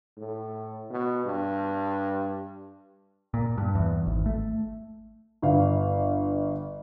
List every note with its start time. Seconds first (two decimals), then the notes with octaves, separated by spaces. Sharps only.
0.17 A2
0.90 B2
1.25 G2
3.34 A#2
3.58 G2
3.75 E2
4.06 G#1
4.26 A3
5.42 G1 F5